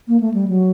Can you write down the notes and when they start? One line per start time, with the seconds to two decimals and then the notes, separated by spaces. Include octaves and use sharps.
0.08 A#3
0.20 A3
0.34 G3
0.48 F#3